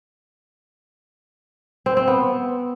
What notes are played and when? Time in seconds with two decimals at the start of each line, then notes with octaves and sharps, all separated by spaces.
1.86 C4
1.97 C4
2.07 B3